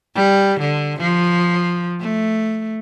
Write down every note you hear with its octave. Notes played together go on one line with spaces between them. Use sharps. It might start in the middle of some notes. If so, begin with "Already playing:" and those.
G3
D3
F3
A3